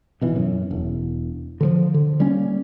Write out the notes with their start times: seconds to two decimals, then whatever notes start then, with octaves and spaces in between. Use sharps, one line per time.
0.21 G#1 B2 E3
0.36 F#2
0.71 E1
1.61 D3 E3 F3
1.94 D3
2.20 G3 A#3 C#4